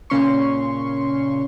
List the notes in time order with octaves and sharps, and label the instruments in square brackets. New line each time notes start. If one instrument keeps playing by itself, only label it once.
[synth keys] A#2 C#3 C#4 C6 C#6